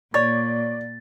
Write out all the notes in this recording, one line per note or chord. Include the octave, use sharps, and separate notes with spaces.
A#2 C#5 D5 A6